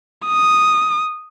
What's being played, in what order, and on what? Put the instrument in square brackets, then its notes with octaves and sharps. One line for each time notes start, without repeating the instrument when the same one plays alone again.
[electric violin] D#6